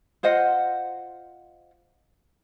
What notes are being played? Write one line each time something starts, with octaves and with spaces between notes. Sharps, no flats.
F4 C5 D#5 F#5